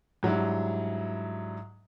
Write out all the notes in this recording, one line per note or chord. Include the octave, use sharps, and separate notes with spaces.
G#2 F#3 G3 D4 E4